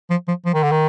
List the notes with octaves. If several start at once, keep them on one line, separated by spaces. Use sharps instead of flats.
F3
F3
F3
D#3
D3
D#3